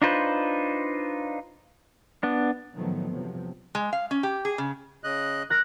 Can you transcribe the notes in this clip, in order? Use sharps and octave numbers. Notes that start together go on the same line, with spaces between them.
D4 D#4 F4 B4 C5
B3 D4
A2 D#3 F3 F#3 A3 B3
E2 G2 C3 F3
G#3
F5
C#4
G4
G#4
C#3
C#3 D#5 F#6
A#4 F#6 A#6